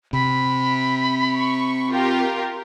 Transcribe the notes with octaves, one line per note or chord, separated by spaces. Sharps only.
C3 B5
C#6
F4 G4 A#4